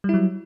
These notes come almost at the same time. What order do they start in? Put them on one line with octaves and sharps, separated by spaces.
G3 E4 F#3